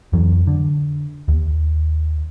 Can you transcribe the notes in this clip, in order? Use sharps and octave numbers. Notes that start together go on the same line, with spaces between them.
F2 E3 F#3
D3
D#2